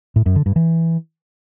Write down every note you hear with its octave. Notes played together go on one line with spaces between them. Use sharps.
A2
F#2
D3
G2
E3